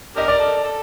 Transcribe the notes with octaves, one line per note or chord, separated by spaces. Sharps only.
D4 G4 A#4 D#5
D5
A4
A4